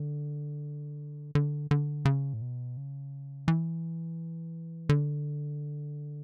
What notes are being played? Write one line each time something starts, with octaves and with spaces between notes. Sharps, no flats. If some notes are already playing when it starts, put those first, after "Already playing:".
Already playing: D3
D3
D3
C#3
A2
B2
C#3
E3
D3